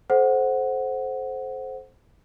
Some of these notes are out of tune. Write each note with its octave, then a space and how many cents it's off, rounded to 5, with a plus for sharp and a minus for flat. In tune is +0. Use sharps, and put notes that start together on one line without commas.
A4 -30 C5 +0 F#5 +0